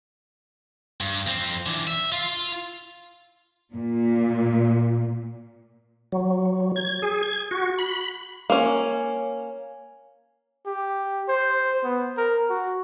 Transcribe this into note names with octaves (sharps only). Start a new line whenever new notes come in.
G2
F2 C4
E3 D4
E5
F4
A#2
F#3
G#6
G#4
G#6
F#4
B5
A#3 C#4
G4
C5
B3
A#4
F#4